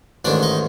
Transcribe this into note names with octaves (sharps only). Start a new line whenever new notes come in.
A1 G#2 D#3 D4 D5
D#4 D#5